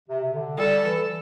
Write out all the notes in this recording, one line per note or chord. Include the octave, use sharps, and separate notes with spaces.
C3
C3
D3
G3 A4
E3